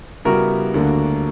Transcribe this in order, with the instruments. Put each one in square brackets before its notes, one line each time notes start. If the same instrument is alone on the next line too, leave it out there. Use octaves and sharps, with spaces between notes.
[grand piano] C#3 G3 B3 E4 G4 [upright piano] F#4 A#4
[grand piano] D2 D3 A#3 D4